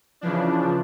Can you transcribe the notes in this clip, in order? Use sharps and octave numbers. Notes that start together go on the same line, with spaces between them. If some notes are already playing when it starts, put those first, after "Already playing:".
C#3 E3 F3 D4